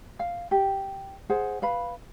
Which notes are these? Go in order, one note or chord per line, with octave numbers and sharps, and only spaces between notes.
F5
G4
G#4 C5 F#5
B4 F5 B5